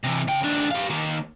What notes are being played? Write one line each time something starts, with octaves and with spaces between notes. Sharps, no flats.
C3 E3
C#3 G5
D#2 D4
G4 F5
D#3 A#3